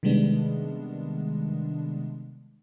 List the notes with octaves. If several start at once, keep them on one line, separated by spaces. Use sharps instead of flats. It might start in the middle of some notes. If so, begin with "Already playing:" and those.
C3 D#3 G3 G#3 B3 D4